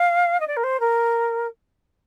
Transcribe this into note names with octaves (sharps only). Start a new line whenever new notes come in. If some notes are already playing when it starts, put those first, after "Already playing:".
Already playing: F5
D#5
D5
A#4
C5
A#4